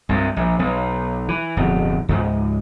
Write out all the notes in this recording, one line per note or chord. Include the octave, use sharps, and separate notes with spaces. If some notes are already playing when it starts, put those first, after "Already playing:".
C2 G2 C3
A#1
B1
E3
D1 F2 B2
C#2 G#2